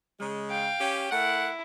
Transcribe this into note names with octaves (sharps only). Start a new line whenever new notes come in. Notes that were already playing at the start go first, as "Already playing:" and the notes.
C#3 G#3
F5 G5
C#4 G4
A3 E4 A#4 F#5